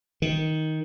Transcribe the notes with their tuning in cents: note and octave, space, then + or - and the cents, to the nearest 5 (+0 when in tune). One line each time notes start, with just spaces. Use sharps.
D#3 +10